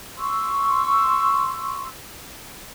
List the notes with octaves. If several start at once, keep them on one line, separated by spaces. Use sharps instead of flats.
C6 C#6 E6